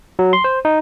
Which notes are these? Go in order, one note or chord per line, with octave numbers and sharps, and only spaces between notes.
F#3
C6
C5
D#4